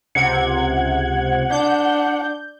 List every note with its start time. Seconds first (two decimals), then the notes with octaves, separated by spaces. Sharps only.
0.15 C#2 C3 F#5 G#6
1.51 D4 G6